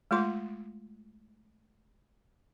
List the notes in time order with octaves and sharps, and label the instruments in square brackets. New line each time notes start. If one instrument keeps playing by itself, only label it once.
[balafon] G#3 A3 F4 C6